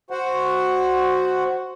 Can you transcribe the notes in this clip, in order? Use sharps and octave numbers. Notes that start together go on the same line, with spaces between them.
F#4 C5 F#5